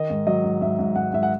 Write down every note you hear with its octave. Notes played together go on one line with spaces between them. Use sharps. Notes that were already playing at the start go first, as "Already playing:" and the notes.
Already playing: D#3 D#5
G#2
F#3 D#5
G#2
G#2 E5
G#2
G#2 F#5
G#2 E5
F#5